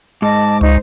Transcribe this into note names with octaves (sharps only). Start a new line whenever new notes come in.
G#2 D#5 A5 D6
C#2 D#4 C5